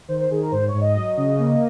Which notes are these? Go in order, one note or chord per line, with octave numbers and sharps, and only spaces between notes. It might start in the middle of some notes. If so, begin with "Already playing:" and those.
D#3 C5
C5
D#3 G#4
A#4
G#2 C5
C#5
G#2
D#5
F#3
C#3
A#3